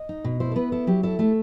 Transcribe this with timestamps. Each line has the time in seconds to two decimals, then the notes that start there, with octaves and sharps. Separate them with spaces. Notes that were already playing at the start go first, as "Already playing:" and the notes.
Already playing: D#5
0.09 D#4
0.24 B2
0.40 E4 C5
0.51 A4
0.56 B3 B4
0.72 E4 A4
0.87 F#3 G4
1.03 E4 A4
1.19 A3 A4